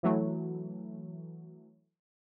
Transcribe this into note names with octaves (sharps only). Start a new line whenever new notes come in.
E3 F#3 A3